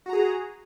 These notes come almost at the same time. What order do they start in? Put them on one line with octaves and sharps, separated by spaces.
F#4 A#5 G#4